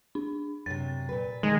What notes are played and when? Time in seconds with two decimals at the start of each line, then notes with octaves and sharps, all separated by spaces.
0.15 D4
0.66 F#2 C3 A6
1.09 A#2 B4
1.43 D#3 G#3